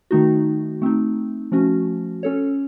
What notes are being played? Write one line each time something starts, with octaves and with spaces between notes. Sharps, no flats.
D#3 A3 D#4 F#4
A3 C4 D#4
F3 A3 C#4 F#4
C#4 A4 C#5